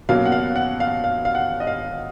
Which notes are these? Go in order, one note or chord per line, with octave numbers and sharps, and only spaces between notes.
B2 F#3 A#3 C#4 F5
F#5
F5
F#5
F5
F5
F5
F#5
D#5
F5